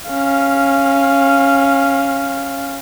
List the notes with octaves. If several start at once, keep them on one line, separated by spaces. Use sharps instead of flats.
C#4 F5